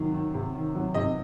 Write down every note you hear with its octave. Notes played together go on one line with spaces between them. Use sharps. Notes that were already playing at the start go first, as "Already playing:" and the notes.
Already playing: C3 D#3 F#3
D#3
C3
D#3
F#3
C3 D#5